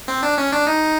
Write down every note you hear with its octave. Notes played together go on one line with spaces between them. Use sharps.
C4
D4
C#4
D4
D#4